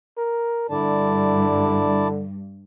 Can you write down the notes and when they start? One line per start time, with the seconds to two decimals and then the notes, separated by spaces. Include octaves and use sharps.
0.18 A#4
0.70 G2 D3 E4 D5 A5